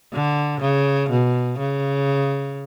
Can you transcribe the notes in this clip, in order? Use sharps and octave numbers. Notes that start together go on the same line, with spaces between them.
D3
C#3
B2
C#3